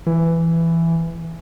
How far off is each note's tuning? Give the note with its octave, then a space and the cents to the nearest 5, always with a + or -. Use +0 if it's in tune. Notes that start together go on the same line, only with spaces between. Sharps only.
E3 +10